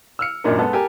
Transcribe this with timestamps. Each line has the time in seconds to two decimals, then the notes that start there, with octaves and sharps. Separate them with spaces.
0.19 E6 F6 C#7
0.44 G#1 F#2 A#2 D4 D#4 A#4
0.58 G#3 B3 A4
0.73 G4 A4 A#4 G#5